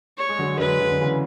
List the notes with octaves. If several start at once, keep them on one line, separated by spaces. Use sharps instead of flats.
C#5
G#3
D3 F#3
G#3
D3 F#3 B4
D3 F#3
D3
C#3 E3